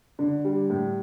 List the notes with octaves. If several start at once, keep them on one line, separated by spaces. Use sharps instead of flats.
D3
G3
A2